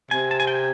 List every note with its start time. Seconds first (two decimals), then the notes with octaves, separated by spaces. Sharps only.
0.11 C3 G#5
0.31 A5
0.40 G#5
0.47 G5
0.55 G#5